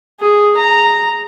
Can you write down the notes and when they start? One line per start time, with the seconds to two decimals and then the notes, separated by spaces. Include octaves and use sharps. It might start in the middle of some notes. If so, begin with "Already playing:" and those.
0.20 G#4
0.57 A#5